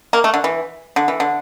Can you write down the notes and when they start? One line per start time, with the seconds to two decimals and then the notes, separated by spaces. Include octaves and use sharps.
0.13 A#3
0.24 A3
0.34 D3
0.44 E3
0.96 D3
1.08 E3
1.20 D3